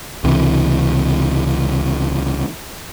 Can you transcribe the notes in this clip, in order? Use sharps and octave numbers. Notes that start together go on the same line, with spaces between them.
C#2 C3 E3